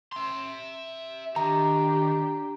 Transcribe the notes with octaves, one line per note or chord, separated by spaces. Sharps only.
E5 C6
D#3 D4 G4 A#5